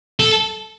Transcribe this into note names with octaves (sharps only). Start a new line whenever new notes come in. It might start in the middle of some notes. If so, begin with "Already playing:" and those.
A4